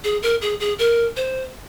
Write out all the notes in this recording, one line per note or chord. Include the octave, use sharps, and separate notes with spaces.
G#4
A#4
G#4
G#4
A#4
C5